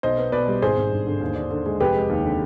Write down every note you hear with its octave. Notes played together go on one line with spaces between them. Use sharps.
B1 C5 D#5
B3
B2 B4 D5
G3
G#1 G#4 C5
G#1
G2
D3
D#2
D4
D3
G#3
F1 G4 B4
G#3
D#2
D3